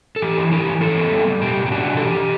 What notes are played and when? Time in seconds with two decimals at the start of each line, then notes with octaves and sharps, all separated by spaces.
0.16 A4
0.22 E3 G4
0.37 E4
0.52 E4 G4
0.67 E3
0.81 E4 A4
0.97 B3
1.12 G3
1.27 G3
1.41 B2 G4
1.57 B2
1.66 G4
1.72 D4 F#4
1.87 B2
1.97 A4
2.01 E3 G4
2.17 E3